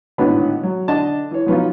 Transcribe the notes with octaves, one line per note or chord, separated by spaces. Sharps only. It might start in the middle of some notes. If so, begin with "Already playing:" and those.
G#1 A2 D3 B3 C#4 B5
F#3
D3 D4 D#5 A5
E3 C#5
F3 F#3 B3 C#4 D#4 F4